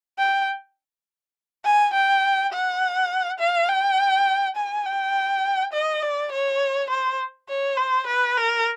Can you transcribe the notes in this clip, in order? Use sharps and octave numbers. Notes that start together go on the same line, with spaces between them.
G5
G#5
G5
F#5
F5
G5
G#5
G5
D#5
D5
C#5
C5
C#5
C5
B4
A#4